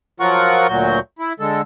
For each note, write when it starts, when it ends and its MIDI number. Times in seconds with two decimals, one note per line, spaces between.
0.20 0.67 53
0.20 0.67 54
0.20 0.67 65
0.20 0.67 70
0.20 0.67 78
0.20 0.67 85
0.68 0.99 38
0.68 0.99 46
0.68 0.99 54
0.68 0.99 66
0.68 0.99 91
1.19 1.33 64
1.40 1.62 50
1.40 1.62 56
1.40 1.62 69